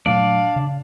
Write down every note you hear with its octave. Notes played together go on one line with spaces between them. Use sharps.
A#2 F#3 A3 D4 D5 F5
C#3